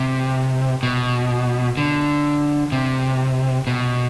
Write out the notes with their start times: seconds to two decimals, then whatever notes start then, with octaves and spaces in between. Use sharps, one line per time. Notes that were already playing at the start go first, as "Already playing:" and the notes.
Already playing: C3
0.83 B2
1.77 D3
2.72 C3
3.67 B2